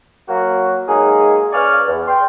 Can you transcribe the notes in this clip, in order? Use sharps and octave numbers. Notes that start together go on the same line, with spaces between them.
F#3 A#3 F#4
F#3 G#3 A#3 D#4 G#4
C#3 B4 D5 G#5 C#6 F6
E2
G5 C6